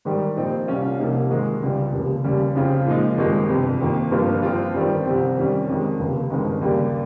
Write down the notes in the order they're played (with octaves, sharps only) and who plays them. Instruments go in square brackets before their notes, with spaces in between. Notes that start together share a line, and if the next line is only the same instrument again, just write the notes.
[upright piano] G#2 D#3 G3
A#2 F3 C4 D#4
C2 C3 G3 C#4 F4
C2 C3 F3 A#3 D#4
G#2 D#3 G#3
C#2 C#3 G3
F1 D#2 C#3
D#2 C#3 G3 C#4
F2 C#3 F3 C4 F4
A#2 F3 G#3 D#4
G#1 G2 D#3 G#3
G1 F2 C3
F2 D#3 A#3
G1 G2 F3 A#3 F4
G2 F3 C4 F4
G1 F2 D#3 G3 C4
C2 C3 F3 C4
F2 D#3 G3 C#4
F2 D#3 G#3
F1 D#2 C#3
G1 F2 D#3 G#3
D#2 C#3 G3 A#3